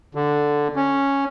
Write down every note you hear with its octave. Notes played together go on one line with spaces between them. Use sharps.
D3
C#4